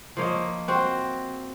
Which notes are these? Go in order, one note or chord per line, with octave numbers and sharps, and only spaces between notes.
F3 A#3 C#5 D#5
C4 F#4